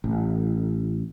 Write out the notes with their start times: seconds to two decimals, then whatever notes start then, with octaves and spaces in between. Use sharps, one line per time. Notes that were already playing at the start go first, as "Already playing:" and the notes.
0.04 A1